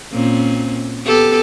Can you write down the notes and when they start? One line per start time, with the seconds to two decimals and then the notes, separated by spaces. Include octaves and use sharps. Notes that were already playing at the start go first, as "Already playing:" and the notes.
0.12 A#2 C4 C#4
1.06 B3 G4 A4